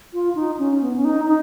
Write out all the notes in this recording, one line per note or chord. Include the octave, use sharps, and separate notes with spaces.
F4
D#4
C#4
B3
C#4
D#4
D#4